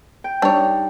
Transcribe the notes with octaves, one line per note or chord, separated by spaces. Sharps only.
G5
G3 D4 D#4 C#5